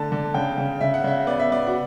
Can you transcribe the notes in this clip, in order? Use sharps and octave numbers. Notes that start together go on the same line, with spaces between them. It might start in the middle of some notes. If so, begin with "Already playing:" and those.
Already playing: D3 A3 A5
D3
C#3 G5
C#3
C#3 E5
F#5
C#3 E5
B3 D5
E5
B3 D5
F#4